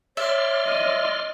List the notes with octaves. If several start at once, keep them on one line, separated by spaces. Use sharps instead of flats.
C#5 D5 E5 C6 F6
D#5